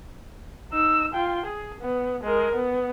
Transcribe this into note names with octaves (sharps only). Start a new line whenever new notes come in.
D#4 E6
F4 G5
G#4
B3
G#3 A#4
B3